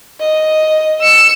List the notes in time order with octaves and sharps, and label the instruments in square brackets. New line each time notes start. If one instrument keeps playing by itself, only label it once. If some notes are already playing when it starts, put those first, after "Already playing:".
[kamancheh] D#5
[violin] E6 C#7